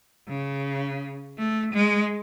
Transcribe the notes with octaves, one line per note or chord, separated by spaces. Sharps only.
C#3
A3
G#3